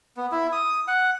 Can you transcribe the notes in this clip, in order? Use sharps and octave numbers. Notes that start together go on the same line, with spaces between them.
B3
E4
D#6
F#5